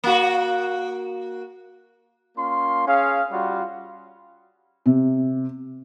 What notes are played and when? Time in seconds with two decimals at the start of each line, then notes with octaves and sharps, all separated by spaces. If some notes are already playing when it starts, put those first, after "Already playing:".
0.04 A#3 F#4
2.37 A#3 C#4 F4 C6
2.87 C#4 G#4 F5
3.31 G3 C#4 F4 F#4
4.86 C3